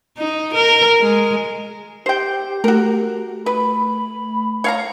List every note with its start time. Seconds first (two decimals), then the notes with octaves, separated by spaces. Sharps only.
0.18 D#4
0.54 A#4
1.00 G#3
2.06 G4 C5 G5
2.64 A3 F#4 A#4
3.46 B4 B5
3.88 B5
4.64 C#5 F5 A#5